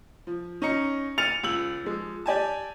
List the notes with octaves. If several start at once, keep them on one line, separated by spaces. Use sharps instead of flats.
F3
C#4 D#4 A#5 C#7
F6 A6 C#7 D#7 F7
C#2 E6 F#7
F3 G#3
G4 D5 G#5 A5